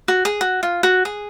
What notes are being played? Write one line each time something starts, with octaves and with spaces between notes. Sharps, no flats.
F#4
G#4
F#4
F4
F#4
G#4